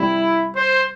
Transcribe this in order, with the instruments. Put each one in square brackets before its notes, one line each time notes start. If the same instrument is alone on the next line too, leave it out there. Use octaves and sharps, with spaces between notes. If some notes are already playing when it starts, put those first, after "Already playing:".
Already playing: [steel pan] G3 C4 [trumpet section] E4
[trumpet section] C5